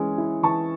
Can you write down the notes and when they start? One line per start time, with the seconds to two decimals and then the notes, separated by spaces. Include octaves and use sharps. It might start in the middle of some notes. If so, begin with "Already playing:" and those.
Already playing: E3 G#3 C#4
0.18 E4
0.43 E3 A5 C#6